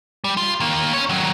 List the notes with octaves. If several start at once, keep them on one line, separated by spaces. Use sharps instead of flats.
G3
F4
D#3 A#3
C#4 C#5
D#3 F#3